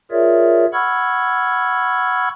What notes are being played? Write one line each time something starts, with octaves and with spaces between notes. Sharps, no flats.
F4 G#4 A#4 C#5 D5 E5
F#5 B5 C#6 E6 F6 G#6